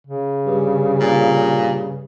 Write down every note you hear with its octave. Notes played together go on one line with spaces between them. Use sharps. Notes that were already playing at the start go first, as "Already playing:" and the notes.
C#3
G2
A#2